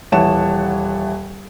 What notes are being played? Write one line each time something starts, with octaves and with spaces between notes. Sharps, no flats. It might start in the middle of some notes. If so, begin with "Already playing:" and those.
D#1 E3 C#5 F#5 A5 E7